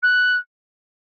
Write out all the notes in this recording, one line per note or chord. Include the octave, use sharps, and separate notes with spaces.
F#6